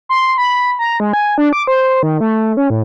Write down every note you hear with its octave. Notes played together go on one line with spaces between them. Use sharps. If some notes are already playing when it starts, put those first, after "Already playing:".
C6
B5
A#5
G#3
G#5
D4
D6
C5
D#3
A3
C#4
A2